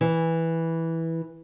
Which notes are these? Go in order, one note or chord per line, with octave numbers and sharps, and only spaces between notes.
E3